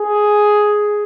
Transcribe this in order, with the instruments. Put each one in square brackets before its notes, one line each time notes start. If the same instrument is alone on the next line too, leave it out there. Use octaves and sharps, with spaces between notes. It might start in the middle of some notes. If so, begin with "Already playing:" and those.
Already playing: [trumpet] G#4